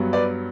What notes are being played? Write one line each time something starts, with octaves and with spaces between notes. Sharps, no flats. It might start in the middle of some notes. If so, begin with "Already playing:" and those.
Already playing: G2 F#3 B3
B4 D5